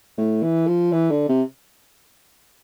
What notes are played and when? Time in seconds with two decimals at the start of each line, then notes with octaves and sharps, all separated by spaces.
0.18 A2
0.43 E3
0.67 F3
0.92 E3
1.11 D3
1.29 C3